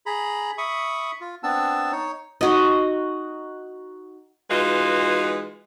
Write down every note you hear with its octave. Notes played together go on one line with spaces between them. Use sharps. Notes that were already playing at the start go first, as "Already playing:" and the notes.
G#4 A#5 B5
E5 B5 C#6 D#6
F4
B3 C4 D4 A5 E6
D#4 C#5
D#4 F#4 D#5
E3 G#3 D#4 F4 F#4 B4